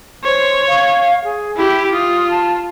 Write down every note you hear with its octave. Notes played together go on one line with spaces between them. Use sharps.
C5 C#5
F5
G#4
E4 G4 B5
F4 D#6
A5